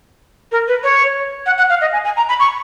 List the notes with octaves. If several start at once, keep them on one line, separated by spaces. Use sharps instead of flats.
A#4
B4
C#5
F#5
F#5
F5
D#5
G#5
G#5
A#5
B5
C#6